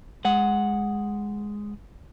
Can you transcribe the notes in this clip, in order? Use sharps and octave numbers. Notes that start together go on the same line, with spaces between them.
G#3 F#5